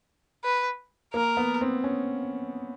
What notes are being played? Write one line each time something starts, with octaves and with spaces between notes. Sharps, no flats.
B4
A#3 A#4
B3
C4
C#4